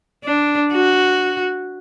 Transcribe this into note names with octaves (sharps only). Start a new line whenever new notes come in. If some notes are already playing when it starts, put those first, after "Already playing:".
D4
F#4